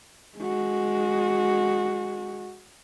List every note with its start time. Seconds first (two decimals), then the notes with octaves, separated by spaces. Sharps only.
0.38 G#3 F#4